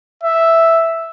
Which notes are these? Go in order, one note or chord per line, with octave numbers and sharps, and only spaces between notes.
E5